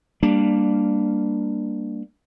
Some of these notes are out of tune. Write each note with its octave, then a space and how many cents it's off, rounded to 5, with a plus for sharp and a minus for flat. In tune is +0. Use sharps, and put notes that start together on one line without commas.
G3 +20 A#3 +0 D4 +5